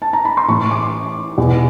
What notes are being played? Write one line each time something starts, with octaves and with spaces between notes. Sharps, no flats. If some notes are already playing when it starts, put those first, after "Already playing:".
A5
A#5
B5
C6
A2 E3 C#6
D6
E2 B2